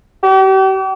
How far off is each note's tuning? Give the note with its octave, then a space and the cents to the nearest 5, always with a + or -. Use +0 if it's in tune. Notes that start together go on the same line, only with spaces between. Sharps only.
G4 -40